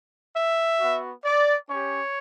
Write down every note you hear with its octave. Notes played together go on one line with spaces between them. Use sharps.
E5
B3 F#4
D5
C#4 G4 C#5